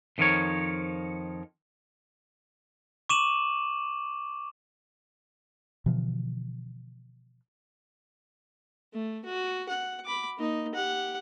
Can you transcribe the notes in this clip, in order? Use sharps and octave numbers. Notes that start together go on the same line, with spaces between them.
F2 D#3 F3 A#4 C#5
C#6 D6 D#7 E7 F#7
B2 D3 E3 F3
A3
F#4
F#5
B5 D6
A#3 D#4
G4 F#5